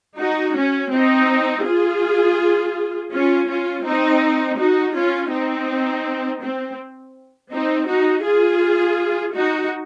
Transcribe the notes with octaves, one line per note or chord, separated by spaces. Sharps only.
D#4 F#4
C#4
C4 D#4
F4 G#4
C#4 F4
C#4 F4
C4 D#4
D#4 F#4
C#4 F4
C4 D#4
C4
C4 D#4
D#4 F#4
F4 G#4
D#4 F#4